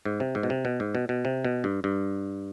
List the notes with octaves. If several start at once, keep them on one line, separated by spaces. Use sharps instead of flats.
G#2
C3
G#2
B2
C3
B2
G#2
B2
B2
C3
B2
G2
G2